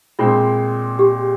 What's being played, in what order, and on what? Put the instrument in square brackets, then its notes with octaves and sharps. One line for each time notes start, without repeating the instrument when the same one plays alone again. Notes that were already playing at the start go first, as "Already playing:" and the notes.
[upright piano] A#2 G#3 C4 [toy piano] F4
[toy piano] G4